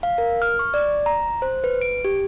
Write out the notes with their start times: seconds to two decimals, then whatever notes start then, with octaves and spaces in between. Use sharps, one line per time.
0.03 F5
0.18 A#4
0.42 F6
0.59 C#6
0.74 D5
1.06 A#5
1.42 C5
1.64 B4
1.82 D7
2.05 G4